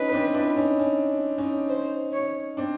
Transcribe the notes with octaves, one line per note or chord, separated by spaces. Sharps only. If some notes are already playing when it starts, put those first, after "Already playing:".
Already playing: C#4 D#4 B4
C4 D4
D4 E4
C#4 D#4
C#4
C#4 D#4
C5
C#5
C4 D4